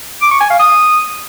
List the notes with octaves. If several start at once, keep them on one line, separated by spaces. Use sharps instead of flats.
D6
C#6
G#5
F5
D#6